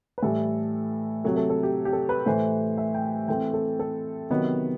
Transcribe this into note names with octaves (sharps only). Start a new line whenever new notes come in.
B4
A2 E3 G3 A4
C3 F#3 A3 A4
A4
A4
G4
G4
A4
B4
A2 E3 A3 C5
E5
G5
E3 A3 C4 G5
A4
A4
C3 D#3 F#3 B3